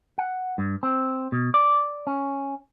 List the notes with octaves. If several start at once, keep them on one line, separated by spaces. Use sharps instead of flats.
F#5
G2
C4
B2
D5
C#4